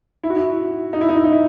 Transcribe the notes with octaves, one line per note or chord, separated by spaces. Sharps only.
E4
F#4
E4
D#4
E4
D#4
E4
D#4
E4